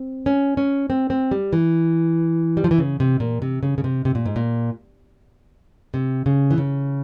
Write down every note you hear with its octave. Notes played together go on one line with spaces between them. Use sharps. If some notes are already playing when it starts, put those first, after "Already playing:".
Already playing: C4
C#4
C#4
C4
C4
G3
E3
G3
F3
E3
C#3
C3
A#2
C3
C#3
C#3
C3
C3
A#2
G#2
A#2
C3
C#3
E3
C#3